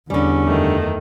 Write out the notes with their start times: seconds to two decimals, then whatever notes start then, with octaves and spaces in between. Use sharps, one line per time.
0.10 E2 D3 G3 C#4
0.44 F#2 D#3 A3